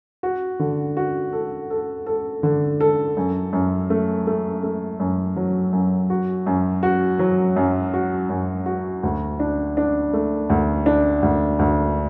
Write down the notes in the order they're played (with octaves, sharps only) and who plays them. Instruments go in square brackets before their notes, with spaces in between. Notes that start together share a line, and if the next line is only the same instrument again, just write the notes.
[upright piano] F#4
D3
F#4
A4
A4
A4
D3
A4
F#2
F#2
A3
A3
A3
F#2
F#3
F#2
F#4
F#2
F#4
F#3
F#2
F#4
F#2
F#4
D2
D4
D4
A3
D2
D4
D2
D2